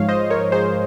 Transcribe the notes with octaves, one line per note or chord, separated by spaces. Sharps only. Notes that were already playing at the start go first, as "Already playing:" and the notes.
Already playing: G#2 F3 G#3 C#5 F5
C5 D#5
A#4 C#5
G#4 C5